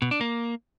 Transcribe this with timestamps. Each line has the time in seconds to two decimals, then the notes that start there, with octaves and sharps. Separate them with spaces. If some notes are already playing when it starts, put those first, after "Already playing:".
0.02 B2
0.11 D4
0.21 A#3